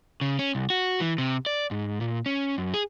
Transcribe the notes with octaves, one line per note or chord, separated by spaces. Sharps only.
C#3
C#4
C2
F#4
E3
C3
D5
G#2
A#2
C#4
F#2
G#4